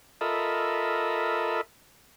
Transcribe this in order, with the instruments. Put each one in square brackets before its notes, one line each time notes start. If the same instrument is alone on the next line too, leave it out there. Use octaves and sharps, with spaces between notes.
[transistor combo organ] F4 A4 A#4 D#5 E5 B5